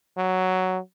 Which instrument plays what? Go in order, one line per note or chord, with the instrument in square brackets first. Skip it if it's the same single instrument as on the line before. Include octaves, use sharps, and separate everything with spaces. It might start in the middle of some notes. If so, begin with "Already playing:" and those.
[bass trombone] F#3